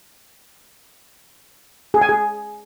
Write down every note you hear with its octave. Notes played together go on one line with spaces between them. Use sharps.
G#4
G#5
G#4